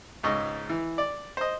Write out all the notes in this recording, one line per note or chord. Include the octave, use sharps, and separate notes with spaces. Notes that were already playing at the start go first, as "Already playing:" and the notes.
C#2 G#2 D#5 C#6
E3
D5
C5 D#5